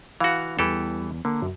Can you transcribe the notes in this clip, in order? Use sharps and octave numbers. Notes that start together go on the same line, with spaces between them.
E3 F#4 F5
E2 E3 G3 G4 A4
D3 A#3
F#2